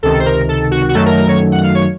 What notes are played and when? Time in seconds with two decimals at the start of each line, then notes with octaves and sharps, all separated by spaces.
0.03 C#2 C3 D#3 A4
0.20 C5
0.26 A#4
0.49 A4
0.71 F#4
0.89 F#4
0.95 F#2 D#3 F#3 A3 A4
1.06 A#4
1.17 A#4
1.29 C#5
1.52 F#5
1.63 F5
1.75 C#5